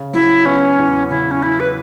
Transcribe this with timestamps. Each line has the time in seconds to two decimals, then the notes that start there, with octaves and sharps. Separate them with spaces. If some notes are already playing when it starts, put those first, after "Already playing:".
Already playing: C#3
0.14 F#3 E4
0.45 B3 C#4
0.78 E2
1.10 C#3 E4
1.31 C#4
1.42 F#3 E4
1.60 B4